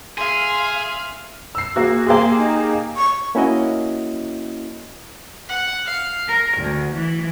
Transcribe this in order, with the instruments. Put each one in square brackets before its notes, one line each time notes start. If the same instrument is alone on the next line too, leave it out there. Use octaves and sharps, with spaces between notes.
[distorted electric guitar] G#4 [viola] E5 F5 [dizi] C6
[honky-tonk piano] E6 C7
[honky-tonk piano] A#3 F#4 [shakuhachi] G#4
[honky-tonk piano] A#3 G4 G#4 [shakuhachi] C6
[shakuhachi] D#4
C#6
[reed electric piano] A#3 C#4 E4 F#4 D#5
[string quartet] F#5
F5
A#4
D2
E3